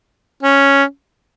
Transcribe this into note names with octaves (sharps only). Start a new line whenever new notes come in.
C#4